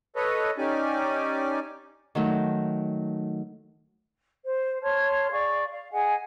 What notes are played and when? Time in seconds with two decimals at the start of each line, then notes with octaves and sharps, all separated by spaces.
0.16 A4 B4 C#5 D#5
0.58 C#4 D#4 G4 D5 G#5
2.15 D#3 F#3 A3
4.46 C5
4.83 C#5 A5 C6 F6
5.31 G#4 D5 F5 C#6
5.70 F5
5.93 G#4 D#5 F#5 G#5